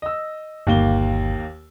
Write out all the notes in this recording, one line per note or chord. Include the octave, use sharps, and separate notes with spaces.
D#5 E6
G1 D#2 A#3 G7